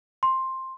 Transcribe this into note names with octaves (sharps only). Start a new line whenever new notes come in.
C6